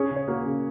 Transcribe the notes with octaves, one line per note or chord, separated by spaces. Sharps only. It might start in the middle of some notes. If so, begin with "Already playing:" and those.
Already playing: C#4 G#4 C#5
C#3
C#5
A#3 F#4 A#4
C#3